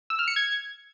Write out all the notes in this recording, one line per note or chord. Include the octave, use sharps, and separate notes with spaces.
E6
F6
C#7
G#6